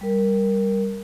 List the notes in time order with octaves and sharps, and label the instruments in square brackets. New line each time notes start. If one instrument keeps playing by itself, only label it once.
[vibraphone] G3 A#4